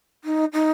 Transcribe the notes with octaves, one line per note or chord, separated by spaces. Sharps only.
D#4
D#4